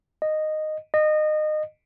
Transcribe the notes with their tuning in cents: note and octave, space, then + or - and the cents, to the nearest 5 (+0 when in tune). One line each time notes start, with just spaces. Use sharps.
D#5 -10
D#5 -25